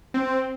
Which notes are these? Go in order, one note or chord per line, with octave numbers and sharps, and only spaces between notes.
C4